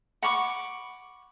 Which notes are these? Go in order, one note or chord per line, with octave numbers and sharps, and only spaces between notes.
F#5 B5 C#6 D6